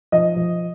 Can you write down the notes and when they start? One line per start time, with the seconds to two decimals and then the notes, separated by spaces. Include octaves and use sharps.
0.12 F3 D#5
0.36 F3